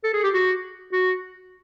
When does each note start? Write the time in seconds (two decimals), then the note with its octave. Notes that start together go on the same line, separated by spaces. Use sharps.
0.04 A4
0.14 G#4
0.23 G4
0.34 F#4
0.92 F#4